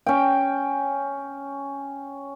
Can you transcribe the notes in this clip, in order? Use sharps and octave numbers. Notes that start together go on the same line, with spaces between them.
C#4 G5